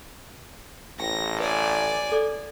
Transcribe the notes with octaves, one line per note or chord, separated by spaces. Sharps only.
A1 G5 A#6
B4 D5 G#5
A4 D5